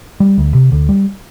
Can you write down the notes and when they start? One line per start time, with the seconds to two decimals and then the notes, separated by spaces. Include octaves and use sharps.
0.20 G3
0.38 D2
0.55 C3
0.72 D2
0.89 G3